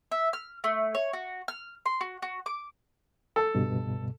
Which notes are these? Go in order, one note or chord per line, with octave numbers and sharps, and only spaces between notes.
E5
F6
A3
C#5
F#4
F6
C6
F#4
F#4
D6
A4
C#2 G2 B2